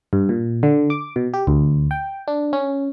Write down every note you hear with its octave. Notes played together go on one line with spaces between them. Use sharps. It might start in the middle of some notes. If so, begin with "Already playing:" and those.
G2
A#2
D3
D6
B2
G4
D2
G5
D4
C#4